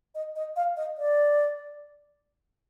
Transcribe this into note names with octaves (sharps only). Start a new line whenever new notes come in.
D#5
D#5
F5
D#5
D5